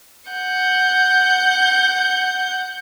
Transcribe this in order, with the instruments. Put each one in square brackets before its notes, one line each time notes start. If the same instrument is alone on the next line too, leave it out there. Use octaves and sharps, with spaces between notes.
[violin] F#5 G6